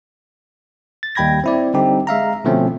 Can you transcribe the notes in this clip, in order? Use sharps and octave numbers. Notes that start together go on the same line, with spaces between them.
A6
D#2 G3 G5 B5 G#6 A#6
C4 E4 D5
D3 G3 C4 D#4 G4
G#3 E5 F5 A#5
B2 D3 F3 A3 C4 C#4